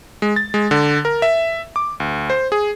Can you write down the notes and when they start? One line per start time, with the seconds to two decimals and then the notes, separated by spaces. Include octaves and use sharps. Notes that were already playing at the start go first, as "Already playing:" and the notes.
0.22 G#3
0.36 A6
0.54 G#3
0.71 D3
1.05 A#4
1.22 E5
1.76 D6
2.00 D2
2.30 C5
2.52 G#4